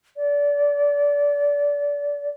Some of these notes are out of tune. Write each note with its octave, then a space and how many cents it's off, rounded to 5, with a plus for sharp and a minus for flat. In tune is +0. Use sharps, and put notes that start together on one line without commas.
D5 -25